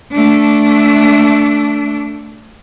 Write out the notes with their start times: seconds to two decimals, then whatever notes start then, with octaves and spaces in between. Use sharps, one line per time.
0.12 A3 D4